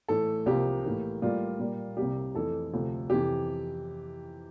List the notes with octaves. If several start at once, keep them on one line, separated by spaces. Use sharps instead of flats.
A2 E3 A3 A4
C2 C3 F3 A#3 G4
A2 E3 A#3
A2 G3 A#3 F4
A#2 G3 A#3
C2 C3 G3 A#3 G4
F2 E3 A3 A4
D2 C3 F3
F2 C3 E3 G4